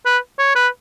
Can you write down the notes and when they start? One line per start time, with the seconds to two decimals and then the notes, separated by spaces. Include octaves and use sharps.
0.06 B4
0.39 C#5
0.55 B4